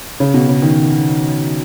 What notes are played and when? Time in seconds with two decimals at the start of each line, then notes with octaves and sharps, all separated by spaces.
0.20 C#3
0.34 B2
0.48 C#3
0.62 D#3